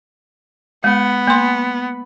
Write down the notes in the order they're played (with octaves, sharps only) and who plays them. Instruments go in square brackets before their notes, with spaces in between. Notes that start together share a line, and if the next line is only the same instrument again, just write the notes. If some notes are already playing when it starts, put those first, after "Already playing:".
[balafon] G#3 [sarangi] B3
[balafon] A#3 C6